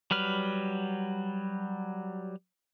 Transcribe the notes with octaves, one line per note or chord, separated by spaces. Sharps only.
F#3 G3 B4 F6